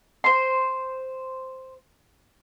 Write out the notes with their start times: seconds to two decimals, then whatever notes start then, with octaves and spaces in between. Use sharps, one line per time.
0.24 C5 C6